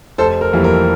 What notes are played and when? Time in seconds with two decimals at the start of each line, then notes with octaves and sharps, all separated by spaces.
0.18 F1 A4 C5
0.41 A#4
0.53 F2 E3 G3 A#3
0.64 A#4